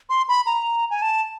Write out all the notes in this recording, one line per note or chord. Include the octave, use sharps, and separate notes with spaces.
C6
B5
A#5
G#5
A5